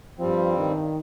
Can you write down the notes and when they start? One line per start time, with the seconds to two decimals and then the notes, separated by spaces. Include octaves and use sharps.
0.19 G2 F3 G3 C4
0.58 D#3